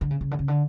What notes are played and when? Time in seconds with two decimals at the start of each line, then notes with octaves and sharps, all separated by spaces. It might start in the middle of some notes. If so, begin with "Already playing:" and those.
0.01 D3
0.11 C#3
0.21 C#3
0.31 D3
0.39 C#3
0.48 D3